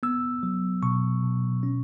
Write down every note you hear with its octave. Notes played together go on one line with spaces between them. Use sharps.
B3 E6
F#3
B2 C#6
B2
C#4